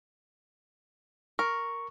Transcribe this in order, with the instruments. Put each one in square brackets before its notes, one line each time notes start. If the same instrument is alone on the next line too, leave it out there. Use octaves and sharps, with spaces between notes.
[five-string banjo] A#4 [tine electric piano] C#6